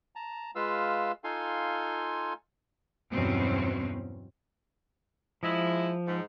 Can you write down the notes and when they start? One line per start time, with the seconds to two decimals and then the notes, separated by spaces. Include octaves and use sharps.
0.16 A5 A#5
0.55 G#3 F4 B4 F5 E6
1.24 D#4 F4 A4 F5 G#5 C6
3.12 E2 G2 B2 F#3 C4 C#4
5.43 F3 G#3 E4
6.06 G#2